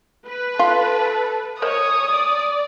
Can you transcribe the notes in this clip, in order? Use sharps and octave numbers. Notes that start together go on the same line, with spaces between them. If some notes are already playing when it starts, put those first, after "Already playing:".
B4
F4 A4
A#4 C5 C#5 D#5 D#6
D5